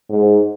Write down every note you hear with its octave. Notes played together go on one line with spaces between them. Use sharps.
G#2